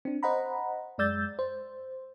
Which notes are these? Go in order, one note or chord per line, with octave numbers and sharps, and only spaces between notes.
C4 D4
C5 D#5 F#5 A#5 B5
F#2 G#3 D5 E6 G6 A6
C5